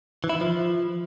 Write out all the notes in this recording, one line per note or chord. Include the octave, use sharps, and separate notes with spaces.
E3
E4
E3
F3